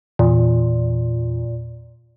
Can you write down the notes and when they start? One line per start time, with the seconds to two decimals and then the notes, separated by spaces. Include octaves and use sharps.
0.19 E2 A#2